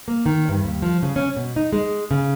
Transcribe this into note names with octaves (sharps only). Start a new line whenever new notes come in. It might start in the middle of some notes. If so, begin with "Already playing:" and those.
A#3
D#3
G2
D#2
F3
C#3
C#4
B2
D#4
G#3
C#3